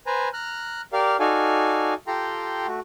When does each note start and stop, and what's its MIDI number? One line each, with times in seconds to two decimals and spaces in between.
0.06 0.29 71
0.06 0.29 72
0.06 0.29 80
0.06 0.29 82
0.33 0.81 82
0.33 0.81 89
0.33 0.81 90
0.93 1.17 67
0.93 1.17 70
0.93 1.17 74
0.93 1.17 77
1.20 1.94 63
1.20 1.94 66
1.20 1.94 69
1.20 1.94 74
1.20 1.94 77
1.20 1.94 80
2.07 2.67 65
2.07 2.67 67
2.07 2.67 69
2.07 2.67 79
2.07 2.67 82
2.07 2.67 84
2.67 2.80 57
2.67 2.80 66